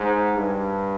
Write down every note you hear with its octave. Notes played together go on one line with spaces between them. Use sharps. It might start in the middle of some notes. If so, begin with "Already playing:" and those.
Already playing: G#2
G2